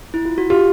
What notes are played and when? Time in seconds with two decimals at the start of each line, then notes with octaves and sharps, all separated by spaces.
0.14 E4
0.25 F4
0.38 F#4
0.50 F4 G4